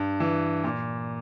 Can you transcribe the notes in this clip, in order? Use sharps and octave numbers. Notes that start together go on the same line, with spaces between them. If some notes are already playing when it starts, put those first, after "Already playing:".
Already playing: G2
E3
A#2